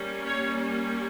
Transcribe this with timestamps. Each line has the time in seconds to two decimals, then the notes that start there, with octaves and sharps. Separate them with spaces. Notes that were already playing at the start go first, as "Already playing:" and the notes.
Already playing: G3 A#3 C#4
0.25 C#5